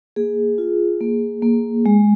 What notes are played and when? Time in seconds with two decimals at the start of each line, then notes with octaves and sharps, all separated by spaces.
0.16 A#3 G#4
0.58 F4
1.00 A#3
1.42 A#3
1.86 G#3